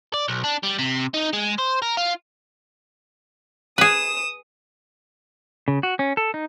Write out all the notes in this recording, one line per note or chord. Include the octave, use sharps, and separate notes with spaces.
D5
B1
D4
G3
C3
D#4
G#3
C5
A#4
F4
G#4 B4 D#6 E7
C#3
F#4
C#4
A4
D#4